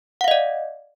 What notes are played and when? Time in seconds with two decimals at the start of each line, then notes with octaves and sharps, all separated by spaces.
0.21 F#5
0.24 F5
0.28 D#5
0.31 D5